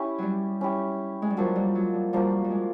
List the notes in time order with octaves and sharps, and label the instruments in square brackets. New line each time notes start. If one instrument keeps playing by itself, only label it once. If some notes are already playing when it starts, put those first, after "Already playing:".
Already playing: [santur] C#4 E4 G4
[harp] F#3 G3
[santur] C#4 E4 G4
[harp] G#3
G3
[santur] F3 A#3 D4 F#4 [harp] F#3
[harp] G3
F#3
G3
[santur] F3 A#3 D4 F#4 [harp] G3
[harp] G3
G#3